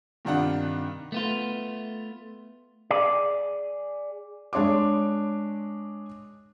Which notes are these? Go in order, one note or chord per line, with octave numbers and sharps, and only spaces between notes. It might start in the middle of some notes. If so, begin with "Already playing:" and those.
G2 C3 D#3 D4 F4 F#5
A3 B3 F4
G#4 D5
G#3 D4 C#5 C6 D6